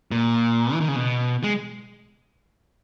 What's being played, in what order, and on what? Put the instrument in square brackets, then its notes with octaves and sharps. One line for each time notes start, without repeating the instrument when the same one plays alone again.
[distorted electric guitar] A#2
E3
D#3
C#3
B2
G#3